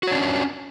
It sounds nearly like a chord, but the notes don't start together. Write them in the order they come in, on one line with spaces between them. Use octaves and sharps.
F#4 C#5 D4 C#4